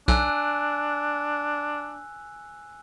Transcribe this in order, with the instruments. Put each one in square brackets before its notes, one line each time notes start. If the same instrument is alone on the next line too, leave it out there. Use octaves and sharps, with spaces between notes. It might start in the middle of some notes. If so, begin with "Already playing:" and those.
[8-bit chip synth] B1 [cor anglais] D4 [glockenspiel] G#5 E6 F#6